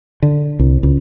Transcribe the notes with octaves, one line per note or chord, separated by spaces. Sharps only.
D3
C2
C#2